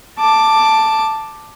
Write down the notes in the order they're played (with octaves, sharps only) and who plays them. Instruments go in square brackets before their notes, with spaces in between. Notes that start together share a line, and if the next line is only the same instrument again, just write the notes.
[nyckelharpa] A5 D6